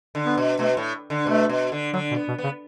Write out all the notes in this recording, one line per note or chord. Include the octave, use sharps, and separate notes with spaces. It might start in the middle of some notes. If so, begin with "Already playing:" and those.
D3
B3
B2
B2 A3
A2
D3
B2 A3
B2
D3
D3 F#3
B2
B3
B2
B3
C#3